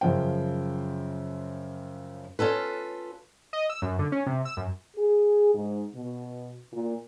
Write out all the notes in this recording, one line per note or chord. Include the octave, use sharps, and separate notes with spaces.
F#2 C#3 F3 C5 G5
C#4 F4 A4 B4
D#5
E6
F#2
D3
C#4
C3
E6
F#2
G#4
G#2
B2
A#2